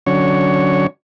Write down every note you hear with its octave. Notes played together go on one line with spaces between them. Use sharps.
D3 F#3 C#4 C#5